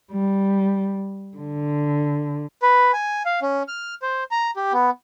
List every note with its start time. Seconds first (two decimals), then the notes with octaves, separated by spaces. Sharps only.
0.12 G3
1.37 D3
2.62 B4
2.93 G#5
3.25 F5
3.42 C#4
3.68 F6
4.02 C5
4.31 A#5
4.56 G4
4.73 B3